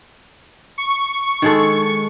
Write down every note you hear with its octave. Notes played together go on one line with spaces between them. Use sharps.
C#6
D#3 G#3 A4